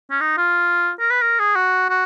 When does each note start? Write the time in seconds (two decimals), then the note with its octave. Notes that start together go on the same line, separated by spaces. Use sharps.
0.11 C#4
0.21 D#4
0.38 F4
1.00 A#4
1.11 B4
1.22 A#4
1.39 G#4
1.56 F#4
1.90 F#4